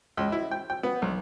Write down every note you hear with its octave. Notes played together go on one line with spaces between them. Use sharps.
C#2
E4
G5
G5
B3
B1